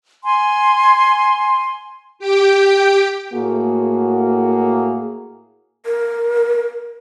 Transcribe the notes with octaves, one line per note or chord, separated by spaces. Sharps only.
G#5 C6
G4 G5
A2 A#3 F#4 G#4
A#4